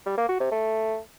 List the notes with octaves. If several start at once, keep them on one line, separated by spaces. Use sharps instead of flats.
G3
A#3
F#4
C3
A3